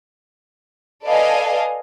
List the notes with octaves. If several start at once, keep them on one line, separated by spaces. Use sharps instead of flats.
A4 B4 D5 D#5 F5 G#5